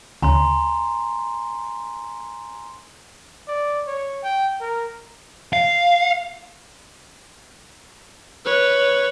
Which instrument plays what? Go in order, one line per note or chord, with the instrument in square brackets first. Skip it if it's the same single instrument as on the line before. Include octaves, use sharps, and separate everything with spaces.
[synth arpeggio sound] D2 C#3 [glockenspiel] G#5 A#5 C6
[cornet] D5
C#5
G5
A#4
[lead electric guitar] F5
[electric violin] B4 C#5